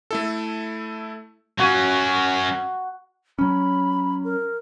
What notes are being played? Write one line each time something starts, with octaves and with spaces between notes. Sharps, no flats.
A3 E4 A4
F#3 C#4 F#4
F#3 C#4 B5
A#4